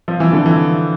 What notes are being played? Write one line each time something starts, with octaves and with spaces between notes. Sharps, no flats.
F3
E3
D3
E3